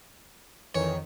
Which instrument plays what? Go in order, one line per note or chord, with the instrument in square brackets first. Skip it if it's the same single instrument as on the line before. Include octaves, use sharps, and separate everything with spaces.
[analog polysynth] F2 D#3 [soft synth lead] E3 [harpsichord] C#5